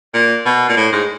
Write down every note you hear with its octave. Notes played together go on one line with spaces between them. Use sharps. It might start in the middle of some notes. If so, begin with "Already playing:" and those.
A#2
B2
A#2
A2
G#2